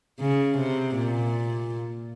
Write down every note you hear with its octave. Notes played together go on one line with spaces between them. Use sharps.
C#3
C3
A#2